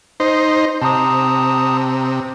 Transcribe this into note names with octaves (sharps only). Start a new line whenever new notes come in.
D#4 C5
C3 A5 A#5 D#6